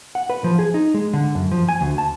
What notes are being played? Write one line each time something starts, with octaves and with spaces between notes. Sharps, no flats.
F#5
B4
F3
G#4
D#4
G#3
D3
F#2
F3
G#5
D2
A5